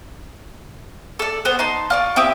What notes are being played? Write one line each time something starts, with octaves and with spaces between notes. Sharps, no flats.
A4 D5
B3 C5
D#4 A5 C6
F4 D5 C#6
C4 E4 G4 D#6